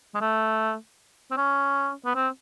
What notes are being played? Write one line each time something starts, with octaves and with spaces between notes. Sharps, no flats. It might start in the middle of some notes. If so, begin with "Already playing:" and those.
G#3
A3
C4
C#4
B3
C4